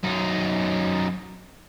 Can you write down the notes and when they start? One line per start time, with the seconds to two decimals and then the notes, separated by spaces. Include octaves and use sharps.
0.03 F#2 D#4